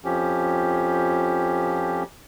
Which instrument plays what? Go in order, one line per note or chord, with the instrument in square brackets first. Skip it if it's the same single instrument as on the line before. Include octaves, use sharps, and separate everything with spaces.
[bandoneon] F2 F3 C#4 G4